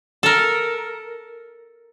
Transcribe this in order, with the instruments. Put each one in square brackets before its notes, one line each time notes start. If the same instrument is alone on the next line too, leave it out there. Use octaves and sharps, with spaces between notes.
[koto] A4 A#4